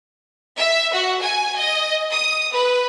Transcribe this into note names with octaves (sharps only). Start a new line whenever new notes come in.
E5
F#4
G#5
D#5
D#6
B4